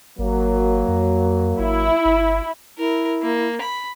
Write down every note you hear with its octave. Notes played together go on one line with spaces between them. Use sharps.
G#1 F#3 A#3
F2
G#1 E4
G1
E4 A#4
A#3
B5